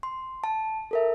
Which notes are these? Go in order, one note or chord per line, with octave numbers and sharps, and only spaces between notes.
C6
A5
A4 A#4 E5